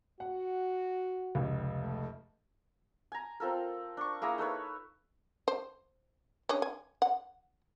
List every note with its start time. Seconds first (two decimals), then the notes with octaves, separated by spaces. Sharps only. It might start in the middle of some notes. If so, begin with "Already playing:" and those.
0.20 F#4 F#5
1.35 F1 C#2
1.80 A3
3.12 G#5 A#5
3.40 C4 F4 A4 A#4
3.97 D4 C#6
4.22 A#3 E4 G#4 A#5
4.38 D#4 A4 B4 C#5
5.48 C5
6.49 C#4 D4 G#4
6.62 G#5
7.02 F#5